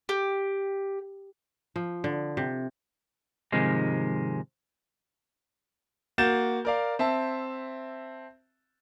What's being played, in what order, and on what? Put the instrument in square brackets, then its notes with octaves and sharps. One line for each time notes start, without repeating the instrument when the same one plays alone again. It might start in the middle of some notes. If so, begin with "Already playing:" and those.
[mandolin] G4
[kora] F3
D3
C3
[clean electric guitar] G#2 C3 D#3 F3 G#3
[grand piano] A#3 F#4 G6 A6 E7
A#4 D5 F5
C4 E5 A5